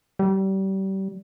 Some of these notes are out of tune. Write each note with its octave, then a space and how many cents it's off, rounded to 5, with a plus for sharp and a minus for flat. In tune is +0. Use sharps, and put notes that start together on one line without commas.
G3 -30